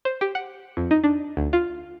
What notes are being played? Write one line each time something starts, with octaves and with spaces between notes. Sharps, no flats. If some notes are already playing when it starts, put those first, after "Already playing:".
C5
G4
F#5
F2
D#4
D4
D2
F4